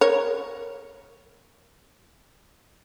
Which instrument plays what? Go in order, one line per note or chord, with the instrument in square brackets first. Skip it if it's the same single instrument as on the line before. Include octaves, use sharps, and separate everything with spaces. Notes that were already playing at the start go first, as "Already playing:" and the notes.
[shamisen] A#4 C#5